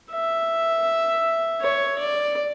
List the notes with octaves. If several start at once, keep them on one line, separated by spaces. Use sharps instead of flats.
E5
C#5
D5